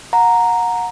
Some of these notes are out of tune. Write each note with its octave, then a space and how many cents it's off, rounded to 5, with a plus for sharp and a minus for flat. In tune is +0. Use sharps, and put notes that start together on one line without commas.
F#5 -30 A#5 +0